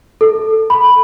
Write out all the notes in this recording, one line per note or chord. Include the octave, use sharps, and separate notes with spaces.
A4
B5